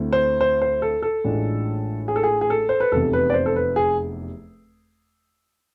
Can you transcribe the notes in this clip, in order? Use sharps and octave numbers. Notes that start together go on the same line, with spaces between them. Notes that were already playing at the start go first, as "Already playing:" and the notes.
Already playing: D2 D3 A3 C4 E4
C5
C5
C5
A4
A4
A1 A2 G#3 D4 F4
G#4
A4
G#4
G#4
A4
C5
B4
F1 E2 C3 A4
B4
D5
C5
A4
B4
G#4